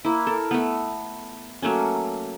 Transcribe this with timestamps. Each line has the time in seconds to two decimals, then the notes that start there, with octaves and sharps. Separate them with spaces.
0.05 A#3 E4
0.27 A4 A#4
0.51 A3 B3
1.62 F#3 A3 A#3 C#4